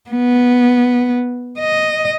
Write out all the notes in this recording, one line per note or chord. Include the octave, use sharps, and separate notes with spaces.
B3
D#5